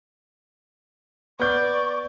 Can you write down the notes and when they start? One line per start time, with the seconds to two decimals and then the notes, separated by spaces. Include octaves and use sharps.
1.39 B3 D5 C#6 G6